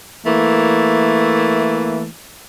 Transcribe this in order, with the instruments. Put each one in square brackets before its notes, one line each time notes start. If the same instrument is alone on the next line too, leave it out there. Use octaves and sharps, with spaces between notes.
[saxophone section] E3 A3 A#3